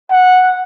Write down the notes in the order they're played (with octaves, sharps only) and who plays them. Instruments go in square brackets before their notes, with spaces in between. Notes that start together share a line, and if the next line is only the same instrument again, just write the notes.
[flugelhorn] F#5